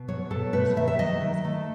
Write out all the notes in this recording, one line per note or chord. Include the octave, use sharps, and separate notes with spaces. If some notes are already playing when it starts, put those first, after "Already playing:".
Already playing: B2
F#3 C#5
B2 A4
A3 B4
D#3 E5
E5
F#3 D#5
D#3
A3